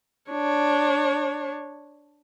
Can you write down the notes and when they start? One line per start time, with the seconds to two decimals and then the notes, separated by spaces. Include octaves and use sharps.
0.31 D4 C#5